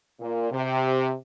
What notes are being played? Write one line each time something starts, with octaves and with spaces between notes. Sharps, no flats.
A#2
C3